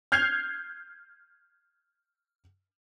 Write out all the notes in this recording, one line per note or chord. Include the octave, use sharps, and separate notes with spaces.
F6 G6 G#6 C7 F7